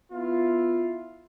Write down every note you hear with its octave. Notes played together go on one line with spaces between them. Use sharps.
B3 E4 F4